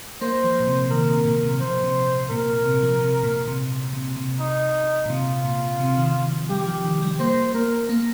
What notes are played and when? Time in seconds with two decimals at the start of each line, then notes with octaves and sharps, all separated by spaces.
0.21 A#3 C5
0.44 F3
0.60 A#2
0.67 C3
0.91 D#3 A#4
1.08 C3
1.25 A#2
1.43 C3
1.60 F3 C5
1.77 A#2
1.84 C3
2.30 A#2 A#4
2.65 C3
2.83 F3
3.00 C3
3.23 A#2
3.47 C3
3.93 C3
4.16 C3
4.40 D#4
5.05 A#2
5.10 C3 F4
5.45 A#2
5.80 C3
5.97 D#3
6.15 D#3
6.32 F3
6.50 G3 G4
6.67 F3
6.84 D#3
7.02 G3
7.19 A#3 C5
7.54 A#3 A#4
7.89 A#3